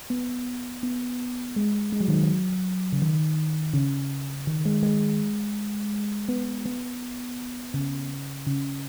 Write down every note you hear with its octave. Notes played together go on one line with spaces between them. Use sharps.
B3
B3
G#3
G#3
F#3
D#3
F#3
C#3
D#3
C#3
D#3
G#3
G#3
B3
B3
C#3
C#3